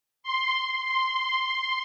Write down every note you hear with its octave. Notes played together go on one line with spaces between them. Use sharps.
C6
C6